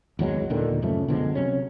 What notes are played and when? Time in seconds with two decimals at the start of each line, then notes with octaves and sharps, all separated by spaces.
0.19 G#1 E2 F#3 G#3
0.50 D#2 A#2 D3 D#3
0.82 F#2 C#3 F3 A3
1.08 B2 D3 F3 G#3
1.35 C3 F#3 C#4